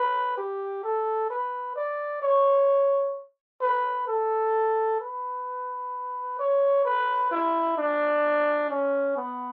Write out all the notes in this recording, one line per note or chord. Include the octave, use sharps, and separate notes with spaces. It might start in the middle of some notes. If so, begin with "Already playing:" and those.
Already playing: B4
G4
A4
B4
D5
C#5
B4
A4
B4
C#5
B4
E4
D4
C#4
B3